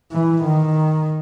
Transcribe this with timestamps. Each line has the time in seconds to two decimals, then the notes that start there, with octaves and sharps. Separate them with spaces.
0.12 E3
0.44 D#3